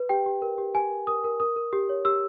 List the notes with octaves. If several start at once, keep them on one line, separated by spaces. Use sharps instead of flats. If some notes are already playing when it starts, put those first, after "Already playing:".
Already playing: B4
G4 G5
G4
A#4
G4
G4 G#5
A#4
A#4 D#6
A#4
A#4 D#6
A#4
G4
C#5
G4 E6